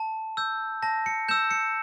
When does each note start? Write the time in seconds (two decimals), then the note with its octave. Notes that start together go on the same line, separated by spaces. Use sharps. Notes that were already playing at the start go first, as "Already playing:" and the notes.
Already playing: A5
0.37 E6 G6
0.82 A5 A#6
1.06 C#7
1.29 E6 G6 E7
1.51 C#7